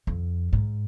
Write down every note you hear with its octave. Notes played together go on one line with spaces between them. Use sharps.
F2
G#2